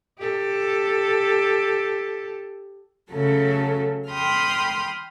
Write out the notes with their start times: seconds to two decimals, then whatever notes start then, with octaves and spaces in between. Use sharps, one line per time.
0.19 G4 A4
3.10 C#3 F#3 A3 A4
4.09 G5 B5 C6 D#6 F6